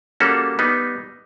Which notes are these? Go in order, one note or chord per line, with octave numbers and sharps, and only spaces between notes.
G3 A#3 C#4 F#4 A4
G3 B3 D#4